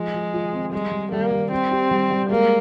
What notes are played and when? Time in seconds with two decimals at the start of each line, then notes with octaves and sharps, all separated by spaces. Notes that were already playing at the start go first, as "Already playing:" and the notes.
Already playing: F3 G#3
0.14 F3
0.34 F4
0.53 C4
0.72 G3 G#3
0.92 G3
1.12 G3 A#3
1.31 G3
1.51 C4 G4
1.71 G4
1.91 G3
2.10 G3
2.30 G#3 A#3